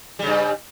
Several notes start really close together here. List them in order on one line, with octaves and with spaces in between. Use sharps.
G3 C#3 G2